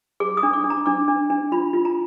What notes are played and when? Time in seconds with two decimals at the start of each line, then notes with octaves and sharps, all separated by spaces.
0.20 G#4 D6
0.37 D#6
0.43 D4
0.53 D6
0.64 D4
0.70 A#5
0.86 D4 D6
1.08 D4
1.30 D4
1.52 F4 B5
1.74 F4
1.85 A#5